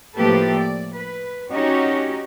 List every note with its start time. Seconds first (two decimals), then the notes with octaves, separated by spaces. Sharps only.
0.16 A2 F3 A#3 G4 A4 B4
0.56 D5
0.93 B4
1.52 C#4 D#4 F#4 G4 C#5